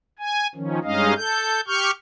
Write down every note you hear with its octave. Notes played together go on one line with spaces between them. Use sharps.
G#5
D#3 F3 C#4
G2 G#3 C#4 D#4 D#5 F5
A4 G6
G4 C#6 F6 G6